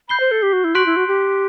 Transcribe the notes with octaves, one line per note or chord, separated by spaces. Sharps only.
B5 G6 C7 G7
C5
A4
G4
F#4
E4
F#4 C6 F#6 B6 D7
E4
F#4
G4